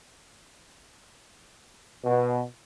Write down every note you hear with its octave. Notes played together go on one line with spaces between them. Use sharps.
B2